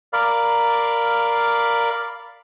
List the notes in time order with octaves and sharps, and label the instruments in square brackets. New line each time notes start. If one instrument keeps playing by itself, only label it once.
[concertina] A#4 D5 F5 B5